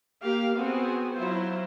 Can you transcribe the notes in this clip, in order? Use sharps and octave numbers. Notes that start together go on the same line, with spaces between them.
A#3 G4 F5
B3 C4 F#4 G#4
F#3 E4 F4 C5